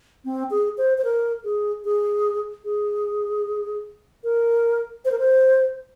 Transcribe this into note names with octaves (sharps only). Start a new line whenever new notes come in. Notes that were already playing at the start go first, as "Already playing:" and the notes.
C4
G#4
C5
C5
A#4
G#4
G#4
G#4
A#4
C5
A#4
C5